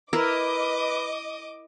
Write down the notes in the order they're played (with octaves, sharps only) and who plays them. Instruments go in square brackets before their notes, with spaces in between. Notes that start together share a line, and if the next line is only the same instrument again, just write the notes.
[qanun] E4 A#4 E5 [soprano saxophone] B4 [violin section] D#5 D6